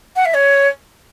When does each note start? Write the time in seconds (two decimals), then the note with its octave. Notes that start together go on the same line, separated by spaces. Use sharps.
0.16 F#5
0.25 E5
0.35 C#5